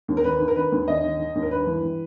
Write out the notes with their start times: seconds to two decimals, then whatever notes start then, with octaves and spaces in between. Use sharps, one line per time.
0.08 D#2
0.17 A#4
0.24 D#3 B4
0.40 D#3
0.48 A#4
0.56 D#3 B4
0.72 D#2
0.88 D#2 D#5
1.04 D#3
1.19 D#3
1.35 D#2
1.43 A#4
1.51 G2 B4
1.67 E3
1.83 E3